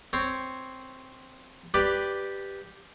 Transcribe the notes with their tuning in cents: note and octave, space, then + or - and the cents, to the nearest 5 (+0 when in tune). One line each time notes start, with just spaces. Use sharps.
C4 +0 C#5 +0
G4 +0 B4 +0 D5 +0